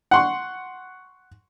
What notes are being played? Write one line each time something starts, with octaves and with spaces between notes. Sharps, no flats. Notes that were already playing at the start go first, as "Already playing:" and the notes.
F#5 C6 C#6